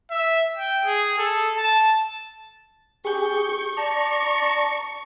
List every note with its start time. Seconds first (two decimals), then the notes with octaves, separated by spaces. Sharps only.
0.11 E5
0.56 G5
0.85 G#4
1.18 A4
1.57 A5
3.05 G4 G#4 C#6 G6
3.77 D5 A5 A#5 C#6